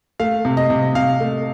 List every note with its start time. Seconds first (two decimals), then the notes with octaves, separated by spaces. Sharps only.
0.20 A3 F5
0.45 C3
0.57 D#5
0.70 C3
0.95 C3 F5
1.20 A3